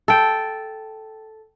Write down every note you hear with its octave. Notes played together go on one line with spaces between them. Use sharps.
A4 G5